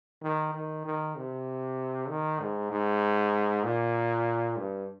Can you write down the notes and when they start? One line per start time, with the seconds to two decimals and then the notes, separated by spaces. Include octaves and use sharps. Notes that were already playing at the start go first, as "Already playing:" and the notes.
0.23 D#3
0.54 D#3
0.85 D#3
1.16 C3
2.09 D#3
2.40 G#2
2.71 G#2
3.64 A#2
4.57 G2